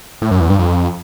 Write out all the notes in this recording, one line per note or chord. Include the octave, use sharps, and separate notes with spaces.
A2
F#2
E2
G2
F2